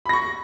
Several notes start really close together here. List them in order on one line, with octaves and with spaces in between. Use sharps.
B5 A#6 C#6